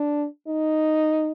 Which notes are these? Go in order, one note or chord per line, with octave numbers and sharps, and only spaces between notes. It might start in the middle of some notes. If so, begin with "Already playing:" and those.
Already playing: D4
D#4